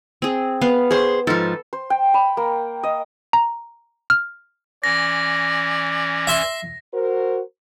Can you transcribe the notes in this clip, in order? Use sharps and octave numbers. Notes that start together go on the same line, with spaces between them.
C4 G#4
B3 F5
G#4 C5
G#2 F3 A4
C5
G5
B5
A#3
D#5
A#5
F6
E3 C#4 D5 A#6
E5 C6
F#4 A#4 C5